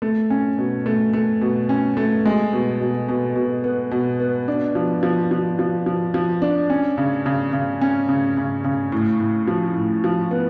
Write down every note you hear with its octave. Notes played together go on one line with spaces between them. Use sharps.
A3
C#4
B2
A3
A3
B2
C#4
A3
G#3
B2
B2
B2
B2
B3
B2
B3
D4
F3
F3
F3
F3
F3
F3
D4
C#4
C#3
C#3
C#3
C#4
C#3
C#3
C#3
A2
A2
F3
A2
F3
B3